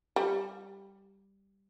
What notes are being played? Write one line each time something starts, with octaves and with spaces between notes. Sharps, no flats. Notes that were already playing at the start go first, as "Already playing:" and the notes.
G3